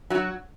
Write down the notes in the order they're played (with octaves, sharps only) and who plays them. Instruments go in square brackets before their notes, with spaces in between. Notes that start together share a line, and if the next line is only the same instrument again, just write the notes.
[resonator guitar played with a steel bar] F#3 F#4